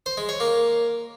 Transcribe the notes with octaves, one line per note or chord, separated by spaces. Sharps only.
C5
G#3
C#5
A#3